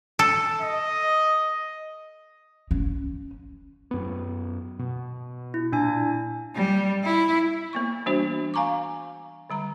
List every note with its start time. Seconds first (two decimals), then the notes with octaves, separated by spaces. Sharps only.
0.19 A4
0.61 D#5
2.71 C#4
3.91 F#2 B3
4.79 B2
5.54 E4
5.73 A#2 D4 G#5
6.55 G3
7.04 E4
7.73 A#3 B3 C#6
8.06 E3 G3 A#3 D4 F#4 C5
8.54 F5 G#5 A#5 C#6 D6
9.50 D3 G3 A#5